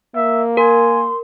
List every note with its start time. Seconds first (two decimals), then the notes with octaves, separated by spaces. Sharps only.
0.16 A#3 E5
0.57 A#4 G#5 C6